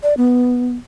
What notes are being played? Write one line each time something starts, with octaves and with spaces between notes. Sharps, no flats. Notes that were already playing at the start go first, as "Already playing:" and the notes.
D5
B3